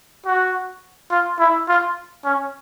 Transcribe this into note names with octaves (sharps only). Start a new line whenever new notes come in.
F#4
F4
E4
F4
C#4